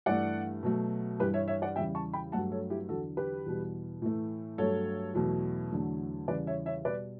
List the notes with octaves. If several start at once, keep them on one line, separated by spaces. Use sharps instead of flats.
G2 E3 A3 D5 F#5
B2 F#3 A3
G2 E3 G3 G4 B4
C#5 E5
C#5 E5
D5 F#5
E2 C#3 G3 E5 G5
A5 C#6
G5 B5
G2 F#3 A3 F#5 A5
A4 C#5
E4 G4
E2 D3 F#3 F#4 A4
G4 B4
E2 B2 G3
A2 E3 A3
G2 F#3 A3 A4 C#5
E2 B2 F#3 A3
E2 D3 F#3 A3
E2 C#3 G3 B4 D5
C#5 E5
C#5 E5
B2 G3 B4 D5